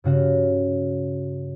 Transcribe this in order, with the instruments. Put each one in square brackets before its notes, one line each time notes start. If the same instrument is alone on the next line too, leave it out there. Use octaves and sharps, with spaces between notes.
[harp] G2 C#3 F#4